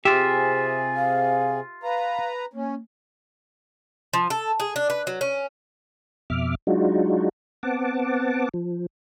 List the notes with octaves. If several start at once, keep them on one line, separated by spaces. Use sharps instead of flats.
C3 F4 G4 G#4 E5 G#5
F5
B4 F5 A#5
A#3 C#4
F3
A4
G#4
D4
B4
F#3
C#4
F2 B2 E5 D6 F6
F#3 G#3 D4 D#4 F4 F#4
B3 C4 F#5 A5 D6
F3